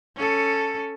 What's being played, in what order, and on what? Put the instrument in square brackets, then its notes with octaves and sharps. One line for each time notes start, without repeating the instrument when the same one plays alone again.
[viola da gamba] C#4 A4